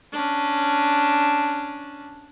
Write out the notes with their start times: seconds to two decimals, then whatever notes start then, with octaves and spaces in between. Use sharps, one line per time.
0.12 C#4 D4